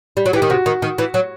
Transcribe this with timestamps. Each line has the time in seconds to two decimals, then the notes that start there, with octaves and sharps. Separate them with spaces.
0.17 G3
0.26 F#3
0.33 E3 G4
0.42 D#3
0.50 C3 F#4
0.66 D#3
0.82 D#3
0.98 E3
1.14 F#3